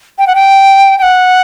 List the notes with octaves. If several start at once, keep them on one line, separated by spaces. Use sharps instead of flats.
G5
F#5
G5
G5
F#5